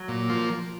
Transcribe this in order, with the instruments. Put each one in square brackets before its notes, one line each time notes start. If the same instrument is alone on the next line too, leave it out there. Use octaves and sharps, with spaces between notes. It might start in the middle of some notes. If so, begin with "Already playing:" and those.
Already playing: [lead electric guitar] F#3
[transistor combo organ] A#2
F3 A#3